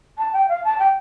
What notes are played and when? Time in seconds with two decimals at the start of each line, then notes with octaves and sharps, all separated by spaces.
0.18 A5
0.33 G5
0.49 F5
0.64 A5
0.79 G5